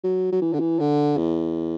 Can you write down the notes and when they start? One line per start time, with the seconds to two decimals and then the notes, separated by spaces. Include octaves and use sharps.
0.04 F#3
0.32 F#3
0.42 E3
0.54 D3
0.60 E3
0.80 D3
1.18 E2